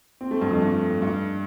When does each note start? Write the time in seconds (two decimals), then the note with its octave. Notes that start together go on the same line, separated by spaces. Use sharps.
0.21 C4
0.31 A3
0.41 G2
0.51 F2
0.62 G2
1.02 G2